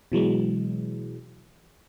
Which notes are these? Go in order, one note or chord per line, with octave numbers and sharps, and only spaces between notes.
B2 E3 F#3 G#3